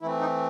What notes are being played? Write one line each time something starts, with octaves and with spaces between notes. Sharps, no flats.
E3 A3 C4 E4
D#4